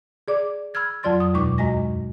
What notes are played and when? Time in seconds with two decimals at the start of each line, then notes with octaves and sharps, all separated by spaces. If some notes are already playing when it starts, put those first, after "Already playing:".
0.28 G#4 D5 D6
0.74 B5 E6 F6 G#6 A6
1.03 F2 F#3 F4 D5 C6 A6
1.20 D#6
1.34 D#2 B2 G#3 D#4 C#6 D6
1.58 F#2 G#3 D#5 G#5 A#6